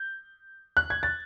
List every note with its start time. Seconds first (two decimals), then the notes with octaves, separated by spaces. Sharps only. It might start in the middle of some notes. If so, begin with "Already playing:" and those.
Already playing: G6
0.77 F#6
0.90 G#6
1.03 A6